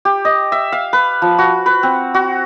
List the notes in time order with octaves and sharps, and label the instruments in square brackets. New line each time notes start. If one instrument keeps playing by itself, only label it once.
[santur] G4
D#5
E5
F5
B4
F3
F#4
B4
C4
F#4